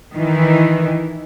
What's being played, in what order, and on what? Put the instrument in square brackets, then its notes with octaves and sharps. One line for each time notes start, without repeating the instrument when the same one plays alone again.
[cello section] D#3 E3